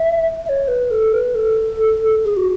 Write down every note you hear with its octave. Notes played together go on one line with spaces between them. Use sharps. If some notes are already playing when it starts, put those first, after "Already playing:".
Already playing: E5
E5
C#5
B4
A4
B4
A4
G#4
F#4